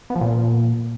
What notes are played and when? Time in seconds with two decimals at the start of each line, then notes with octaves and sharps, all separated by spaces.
0.10 B3
0.16 F3
0.21 A#2